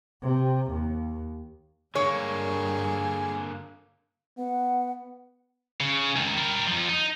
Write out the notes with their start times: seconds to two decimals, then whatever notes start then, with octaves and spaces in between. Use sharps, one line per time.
0.23 C3
0.71 D#2
1.95 G2 D3 G3 A#3 G#4 C#5
4.39 B3 F#5
5.80 C#3
6.16 C#2 D#3
6.38 G3 A#4
6.67 F2 F3
6.89 D#4